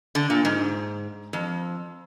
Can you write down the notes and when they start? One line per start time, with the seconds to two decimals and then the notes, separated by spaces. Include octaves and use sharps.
0.15 D3
0.30 A#2
0.45 G#2
1.33 F2